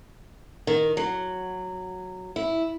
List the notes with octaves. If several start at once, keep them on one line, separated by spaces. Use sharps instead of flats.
D#3
F#3
E4